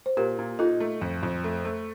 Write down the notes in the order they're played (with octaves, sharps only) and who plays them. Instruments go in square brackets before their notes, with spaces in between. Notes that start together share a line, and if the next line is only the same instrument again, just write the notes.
[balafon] C5
[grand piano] A#2 [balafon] G4 A#4
[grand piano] A#2
[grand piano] D#4 [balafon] F4 A4
[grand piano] A3
F2
F2
A3
A3